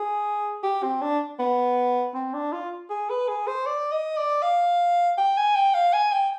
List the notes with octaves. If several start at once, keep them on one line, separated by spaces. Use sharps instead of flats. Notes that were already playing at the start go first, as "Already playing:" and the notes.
Already playing: G#4
G4
C4
D4
B3
C4
D4
F4
G#4
B4
G#4
C5
D5
D#5
D5
F5
G5
G#5
G5
F5
G#5
G5